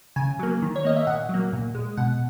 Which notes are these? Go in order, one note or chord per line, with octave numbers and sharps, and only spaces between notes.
C#3 G#5
F#3 A#3
D#3
C#5
A#3 D#5
E5
A#2 F#5
F#3 A#3
A#2
G#3
B2 F#5